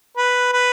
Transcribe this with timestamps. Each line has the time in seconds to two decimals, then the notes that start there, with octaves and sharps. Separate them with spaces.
0.17 B4
0.53 B4